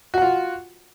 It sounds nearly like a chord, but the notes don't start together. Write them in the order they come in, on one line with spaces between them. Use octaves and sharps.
F#4 F#5 F4